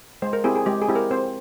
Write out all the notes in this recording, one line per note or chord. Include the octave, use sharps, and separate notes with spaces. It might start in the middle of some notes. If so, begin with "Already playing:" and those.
G#3 C5
A#4
C4 E4 G4 G#4
G#4
G#3 G4
G#4
C4 E4 G4
A#4
C4 C5